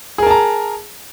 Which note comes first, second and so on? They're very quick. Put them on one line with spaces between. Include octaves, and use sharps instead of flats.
G#4 A#4 A5 A#5